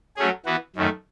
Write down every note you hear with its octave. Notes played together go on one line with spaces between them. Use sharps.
F#3 A3 C#4 G#4
E3 B3 F#4
F#2 D#3 A3